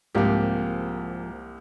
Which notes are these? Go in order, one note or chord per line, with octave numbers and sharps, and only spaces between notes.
C2 G#2 F3 A#3 G4